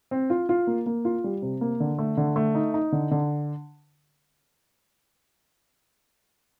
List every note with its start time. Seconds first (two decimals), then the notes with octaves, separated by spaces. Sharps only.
0.11 C4
0.30 F4
0.49 F4
0.67 A#3
0.86 A#3
1.05 F4
1.24 G3
1.42 C3
1.61 A#3
1.80 D3
1.99 A3
2.17 D3
2.36 A3
2.55 D#4
2.74 D#4
2.92 D3
3.11 D3